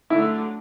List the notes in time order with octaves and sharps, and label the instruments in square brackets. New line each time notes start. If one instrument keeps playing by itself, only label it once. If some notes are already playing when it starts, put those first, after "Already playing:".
[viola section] D3 F#3 A3 D4 [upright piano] E4